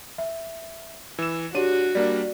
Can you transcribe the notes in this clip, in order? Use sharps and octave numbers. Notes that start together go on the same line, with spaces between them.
E5
E3 E6 E7
D4 F#4 G4 C#5 D#7
G3 A#3 D4 D5